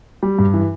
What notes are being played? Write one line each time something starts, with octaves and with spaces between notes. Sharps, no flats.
G3
G2
E3